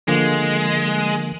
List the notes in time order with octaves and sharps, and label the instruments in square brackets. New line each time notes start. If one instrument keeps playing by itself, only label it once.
[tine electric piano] D3 F3 A#3 [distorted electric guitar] G#3